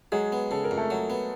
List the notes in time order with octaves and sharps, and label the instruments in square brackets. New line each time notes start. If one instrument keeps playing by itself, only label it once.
[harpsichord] F#3 [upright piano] G#3 G#4
[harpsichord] B3
[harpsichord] C#3 [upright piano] A4
[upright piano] A#4
[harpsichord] F2
[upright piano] A3 A4
[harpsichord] F#3
B3